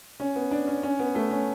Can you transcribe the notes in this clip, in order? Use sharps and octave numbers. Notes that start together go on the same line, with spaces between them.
C#4
B3
D4
C#4
C#4
B3
A3
C#4